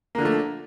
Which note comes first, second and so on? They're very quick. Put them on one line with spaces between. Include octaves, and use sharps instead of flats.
A#3 D3 F3 A3